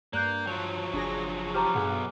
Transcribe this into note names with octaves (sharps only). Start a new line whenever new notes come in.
G2 A#3 D5 F#6 G6
F3 F#3 A5
F#1 D4 G#4 A#6
G4 C5 A5 A#5 D6 F6
B1 G2 B3 G#4 F#5